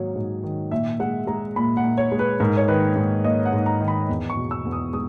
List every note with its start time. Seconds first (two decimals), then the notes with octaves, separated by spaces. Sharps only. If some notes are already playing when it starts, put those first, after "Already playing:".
Already playing: G#2 D#3 F#3 A#3 C#5
0.15 G#2
0.43 D#3
0.71 A#2 E5
1.00 G#3 F#5
1.27 G#3 A#5
1.56 A#2 B5
1.77 F#5
1.84 A#2
1.98 C#5
2.12 G#3
2.19 B4
2.40 G#2 A#4
2.57 C#5
2.68 D#3 B4
2.96 G#2
3.24 A#3 D#5
3.45 F#5
3.53 G#2
3.66 A#5
3.81 D#3
3.88 B5
4.09 E2
4.30 C#6
4.37 B2
4.51 E6
4.65 E2
4.72 D#6
4.93 G#3 D#6